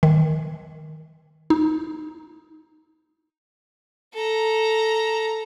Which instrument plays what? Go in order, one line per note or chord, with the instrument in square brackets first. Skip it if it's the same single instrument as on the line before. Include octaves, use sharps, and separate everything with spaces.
[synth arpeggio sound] D#3
D#4
[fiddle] A4 A#5